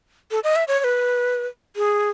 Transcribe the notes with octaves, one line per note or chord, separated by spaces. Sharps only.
A4
D#5
E5
C#5
C#5
B4
G#4